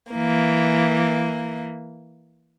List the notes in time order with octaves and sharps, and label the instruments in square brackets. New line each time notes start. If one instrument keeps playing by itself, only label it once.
[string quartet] E3 A#3